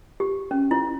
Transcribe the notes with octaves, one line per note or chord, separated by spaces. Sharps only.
G4
C#4
E4